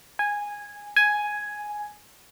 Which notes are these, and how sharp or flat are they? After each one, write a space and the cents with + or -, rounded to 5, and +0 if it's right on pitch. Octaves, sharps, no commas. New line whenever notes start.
G#5 -10
G#5 +5